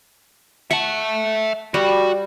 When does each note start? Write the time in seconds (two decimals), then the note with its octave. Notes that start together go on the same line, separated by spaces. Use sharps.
0.71 E5 F#5 A5 C#6
1.74 G3 F#4